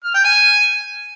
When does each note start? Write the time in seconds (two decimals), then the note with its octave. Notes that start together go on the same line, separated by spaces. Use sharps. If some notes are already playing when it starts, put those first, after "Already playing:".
0.04 F6
0.14 G5
0.25 G#5